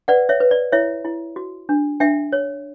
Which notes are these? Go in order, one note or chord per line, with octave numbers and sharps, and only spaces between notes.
B4 D5 F#5
C#5 E5
B4
D5
E4 C#5 E5
E4
F#4
D4
D4 E5 G5
C#5